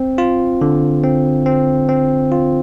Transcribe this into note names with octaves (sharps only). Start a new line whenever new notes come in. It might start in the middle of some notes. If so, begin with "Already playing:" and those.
Already playing: C4
F4
D3
C4
C4
C4
F4